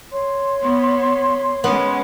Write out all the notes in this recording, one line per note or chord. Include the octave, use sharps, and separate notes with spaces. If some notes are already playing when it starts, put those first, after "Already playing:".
C#5 C6
B3
G#3 B3 C#4